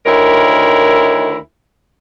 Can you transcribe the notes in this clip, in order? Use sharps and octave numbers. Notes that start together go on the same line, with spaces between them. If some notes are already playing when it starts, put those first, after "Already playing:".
D2 D#3 E4 A#4 C#5